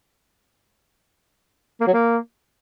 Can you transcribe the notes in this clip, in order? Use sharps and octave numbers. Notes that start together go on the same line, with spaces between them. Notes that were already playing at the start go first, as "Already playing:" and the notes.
A#3
F#3
A#3